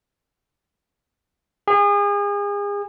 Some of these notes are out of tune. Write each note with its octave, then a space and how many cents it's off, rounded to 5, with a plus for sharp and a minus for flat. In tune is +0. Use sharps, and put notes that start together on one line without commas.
G#4 -35